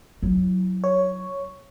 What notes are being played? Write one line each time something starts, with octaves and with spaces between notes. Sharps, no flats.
F#3 E4
C#5